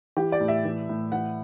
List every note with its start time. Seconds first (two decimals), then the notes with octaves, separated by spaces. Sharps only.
0.17 E3 G4
0.32 D5
0.40 A2
0.48 E5
0.65 E3
0.89 A2
1.12 E3 F#5